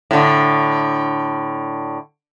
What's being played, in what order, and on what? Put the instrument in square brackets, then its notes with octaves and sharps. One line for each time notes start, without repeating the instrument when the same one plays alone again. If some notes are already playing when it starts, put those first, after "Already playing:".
[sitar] A2 D3